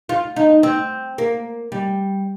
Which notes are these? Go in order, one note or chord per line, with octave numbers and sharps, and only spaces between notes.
F4
D#4
C4
A#3
G3